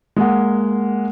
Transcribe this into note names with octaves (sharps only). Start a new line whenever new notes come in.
G#3 A#3 F#5